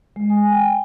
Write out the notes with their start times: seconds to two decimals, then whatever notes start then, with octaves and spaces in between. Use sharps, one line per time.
0.16 G#3
0.30 G#5
0.52 G5